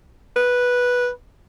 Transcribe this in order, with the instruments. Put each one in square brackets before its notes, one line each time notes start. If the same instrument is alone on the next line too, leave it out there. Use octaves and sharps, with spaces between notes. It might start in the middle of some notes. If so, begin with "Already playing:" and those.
[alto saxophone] B4